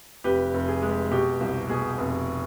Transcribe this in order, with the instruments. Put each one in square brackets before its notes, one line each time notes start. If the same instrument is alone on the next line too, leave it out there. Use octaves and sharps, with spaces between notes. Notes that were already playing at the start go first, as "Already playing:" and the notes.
[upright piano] F1 G4 B4
F1
G#4
G#3
B2 G4
C2
B2 G#4
F1